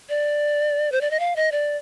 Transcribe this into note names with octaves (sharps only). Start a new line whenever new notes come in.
D5
C5
D5
D#5
F5
D#5
D5